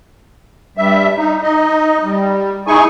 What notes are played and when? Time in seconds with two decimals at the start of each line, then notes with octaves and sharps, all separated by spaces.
0.77 G2 G3 E5
1.17 D#4
1.42 D#4 D#5
2.04 G3
2.67 D#4 E4 G#4 G#5 C#6